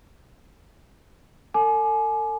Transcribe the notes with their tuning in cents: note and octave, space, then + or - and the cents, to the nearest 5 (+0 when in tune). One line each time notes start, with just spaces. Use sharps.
A4 +40 G#5 +35 D6 +25